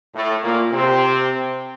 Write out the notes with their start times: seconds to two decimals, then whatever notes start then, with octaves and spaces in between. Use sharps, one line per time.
0.14 A2 A3
0.42 A#2 A#3
0.72 C3 C4